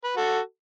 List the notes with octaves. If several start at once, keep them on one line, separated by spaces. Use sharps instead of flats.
B4
F#4 A4